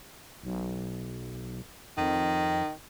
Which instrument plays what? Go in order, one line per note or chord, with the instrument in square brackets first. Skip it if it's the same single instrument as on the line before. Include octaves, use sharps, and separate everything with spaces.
[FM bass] B1
[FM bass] F2 [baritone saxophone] D#3